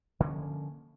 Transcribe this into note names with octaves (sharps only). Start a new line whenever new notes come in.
D3 F3 A#3 C#4